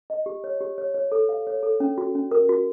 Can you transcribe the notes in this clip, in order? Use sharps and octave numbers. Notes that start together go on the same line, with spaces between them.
D#5
G4
C#5
G4
C#5
C#5
A4
F5
C#5
A4
C#4
F#4
C#4
A#4
F#4